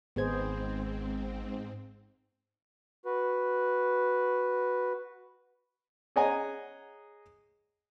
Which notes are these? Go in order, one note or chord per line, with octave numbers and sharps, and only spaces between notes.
G#1 G#2 G#3 B3 C4 G#4 C5 G#6
F#4 B4
G#4 C#5 D#5 F#5 G#5 A#5